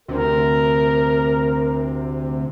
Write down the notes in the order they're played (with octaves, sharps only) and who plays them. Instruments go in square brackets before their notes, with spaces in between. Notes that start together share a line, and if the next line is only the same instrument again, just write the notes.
[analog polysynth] D2 C3 [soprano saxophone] A#4